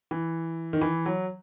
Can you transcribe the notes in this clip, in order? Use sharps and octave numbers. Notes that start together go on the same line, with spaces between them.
E3
D#3
E3
F#3